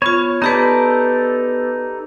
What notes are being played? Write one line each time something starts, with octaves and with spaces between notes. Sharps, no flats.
B3 F4 C#5
B3 D#4 G4 A4 B4 D5